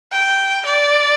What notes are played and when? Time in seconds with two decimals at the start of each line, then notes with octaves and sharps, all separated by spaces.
0.12 G5
0.65 D5